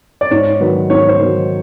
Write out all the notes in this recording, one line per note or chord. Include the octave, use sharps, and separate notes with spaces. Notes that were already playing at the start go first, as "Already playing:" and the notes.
D5
G#2 C#5
D#3 F#3 B4
G#2 C#5
C5
D#3 F#3